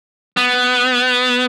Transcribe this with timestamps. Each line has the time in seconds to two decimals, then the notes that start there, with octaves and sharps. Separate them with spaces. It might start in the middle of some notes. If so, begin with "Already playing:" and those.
0.37 B3